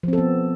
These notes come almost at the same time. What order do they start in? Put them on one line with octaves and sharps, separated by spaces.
F3 C4 A4 B3